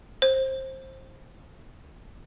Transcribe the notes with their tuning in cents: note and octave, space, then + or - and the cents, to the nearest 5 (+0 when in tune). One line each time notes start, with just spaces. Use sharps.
C5 +20